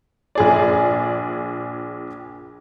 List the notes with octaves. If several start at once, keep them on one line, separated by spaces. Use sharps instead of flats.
A#1 G#4 D5